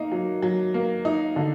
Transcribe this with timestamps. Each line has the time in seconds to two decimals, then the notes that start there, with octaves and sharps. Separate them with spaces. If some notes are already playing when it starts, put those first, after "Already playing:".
Already playing: A#3 D#4
0.12 F#3
0.43 F#3
0.74 A#3
1.05 D#4
1.36 D3